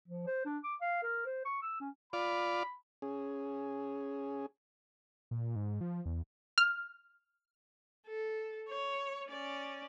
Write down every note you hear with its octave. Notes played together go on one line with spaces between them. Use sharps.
F3
C5
D4
D6
F5
A#4
C5
C#6
E6
C#4
F4 D5 B5
C#4 G#4
A#2
G#2
F3
E2
F6
A4
C#5
C#4 D5